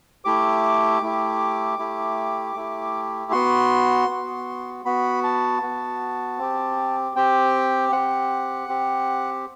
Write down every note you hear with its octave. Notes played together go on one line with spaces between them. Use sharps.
A3 E4 G4 D6
A3 E4 G4
A3 E4 G4
A3 E4 G4
B3 F#4 C6
B3 F#4
B3 F#4 B5
A5
B3 F#4
C4 G4
C4 G4 G5
C4 G4 F#5
C4 G4